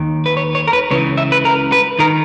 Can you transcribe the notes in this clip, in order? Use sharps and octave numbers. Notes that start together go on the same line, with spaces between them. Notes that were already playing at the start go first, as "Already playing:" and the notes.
Already playing: D#2 D#3
B4
C#5
C#5
A#4
B4
C#2 C#3 E3 C#5
E5
B4
A#4
B4
D#3 A#4